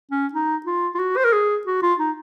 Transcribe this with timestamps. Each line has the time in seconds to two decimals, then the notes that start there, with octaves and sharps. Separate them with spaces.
0.11 C#4
0.33 D#4
0.66 F4
0.94 F4
0.99 F#4
1.17 C5
1.24 A#4
1.33 G#4
1.66 F#4
1.82 F4
1.99 D#4